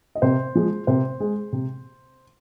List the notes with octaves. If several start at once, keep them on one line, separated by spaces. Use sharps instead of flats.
D#5
C3 C5
F3 G#3
C3 C5
G#3
C3